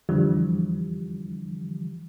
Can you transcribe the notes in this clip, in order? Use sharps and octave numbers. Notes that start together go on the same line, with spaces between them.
F2 D3 E3 F3 G3